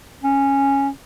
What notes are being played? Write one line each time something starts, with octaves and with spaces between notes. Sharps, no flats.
C#4